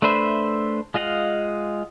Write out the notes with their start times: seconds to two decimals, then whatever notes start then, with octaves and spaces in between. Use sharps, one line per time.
0.02 A3 D4 B4 C5 E5
0.94 G#3 F4 D#5 F5 F#5